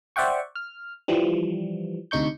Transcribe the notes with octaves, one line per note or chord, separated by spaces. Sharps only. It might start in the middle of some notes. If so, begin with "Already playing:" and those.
C5 D5 E5 F#5 G5 C#6
F6
E3 F3 G3
D2 C3 D#4 C#6 G6